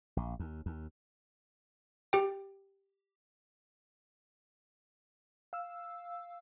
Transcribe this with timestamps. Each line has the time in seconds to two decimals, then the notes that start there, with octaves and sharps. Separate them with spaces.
0.17 A#1
0.40 D#2
0.66 D#2
2.13 G4 G5
5.53 F5 E6